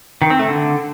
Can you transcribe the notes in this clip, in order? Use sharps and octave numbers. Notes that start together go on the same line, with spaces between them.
D#3
C4
A3
D3